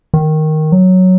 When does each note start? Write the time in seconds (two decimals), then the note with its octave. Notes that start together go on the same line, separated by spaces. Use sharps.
0.14 D#3
0.72 F#3